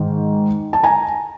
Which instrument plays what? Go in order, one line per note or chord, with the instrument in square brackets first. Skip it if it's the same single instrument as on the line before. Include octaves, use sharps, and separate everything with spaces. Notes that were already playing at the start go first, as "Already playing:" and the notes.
Already playing: [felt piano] G#2 D#3
A5
G#5 A#5